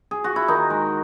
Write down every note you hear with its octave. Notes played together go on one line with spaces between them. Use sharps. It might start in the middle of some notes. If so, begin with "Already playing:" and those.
G#4
F#4
E4
D#3 D#4
G#3